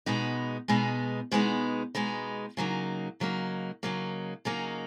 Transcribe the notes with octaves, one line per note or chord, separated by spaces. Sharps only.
B2 G#3 B3 D#4
B2 G#3 B3 D#4
B2 G#3 B3 D#4
B2 G#3 B3 D#4
C#3 F#3 A#3 D#4
C#3 F#3 A#3 D#4
C#3 F#3 A#3 D#4
C#3 F#3 A#3 D#4